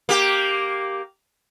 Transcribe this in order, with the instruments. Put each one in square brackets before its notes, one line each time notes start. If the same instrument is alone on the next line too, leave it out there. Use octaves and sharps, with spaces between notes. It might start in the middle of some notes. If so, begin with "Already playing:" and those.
[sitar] A#3 G4